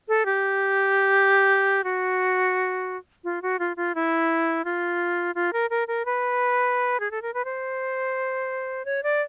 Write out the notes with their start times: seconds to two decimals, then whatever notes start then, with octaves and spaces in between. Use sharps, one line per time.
0.08 A4
0.26 G4
1.84 F#4
3.24 F4
3.42 F#4
3.59 F4
3.77 F4
3.95 E4
4.65 F4
5.35 F4
5.53 A#4
5.70 A#4
5.88 A#4
6.05 B4
7.00 G#4
7.11 A4
7.22 A#4
7.34 B4
7.45 C5
8.85 C#5
9.03 D5